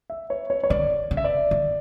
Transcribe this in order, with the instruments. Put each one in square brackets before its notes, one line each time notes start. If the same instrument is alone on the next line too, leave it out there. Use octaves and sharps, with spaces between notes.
[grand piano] E5
C#5
C#5
C#5
[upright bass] D3 [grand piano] D5
[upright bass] C#3
[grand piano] E5
D5
[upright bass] D3